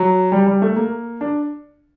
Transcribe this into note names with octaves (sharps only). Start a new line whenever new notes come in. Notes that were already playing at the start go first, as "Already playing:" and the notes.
Already playing: F#3
G3
G3
A3
A#3
D4